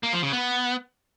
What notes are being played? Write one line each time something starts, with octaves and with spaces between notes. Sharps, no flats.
A#3
F3
C#3
B3